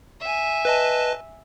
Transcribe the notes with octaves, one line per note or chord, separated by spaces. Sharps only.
E5 G#5
B4 D#5 A5